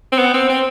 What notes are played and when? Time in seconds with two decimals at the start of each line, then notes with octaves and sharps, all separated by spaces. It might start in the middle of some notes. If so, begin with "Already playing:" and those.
0.12 C4
0.18 B3
0.34 C4
0.49 C4